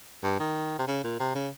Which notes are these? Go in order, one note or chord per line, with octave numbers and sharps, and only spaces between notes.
G2
D#3
C3
C#3
A#2
C3
C#3